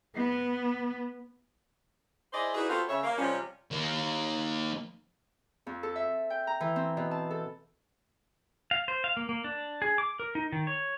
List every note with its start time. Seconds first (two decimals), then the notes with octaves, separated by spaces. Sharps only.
0.16 B3
2.33 E4 G#4 C5 D5 D#5
2.54 D#4 E4 F#4 G#4 B4 D5
2.69 B3 C4 F4 F#4 A4
2.88 C#3 C#5 E5
3.04 A#3
3.18 C3 F3 G3 G#3 C#4
3.71 D#3 A#3
5.67 F2
5.83 A4
5.96 E5
6.30 G5
6.47 A#5
6.60 E3
6.76 C4
6.97 B2
7.11 A5
7.31 A4
8.71 F5
8.88 C5
9.04 F5
9.17 A#3
9.29 A#3
9.44 D4
9.82 G#4
9.98 D6
10.20 A#4
10.35 D#4
10.52 D#3
10.67 C#5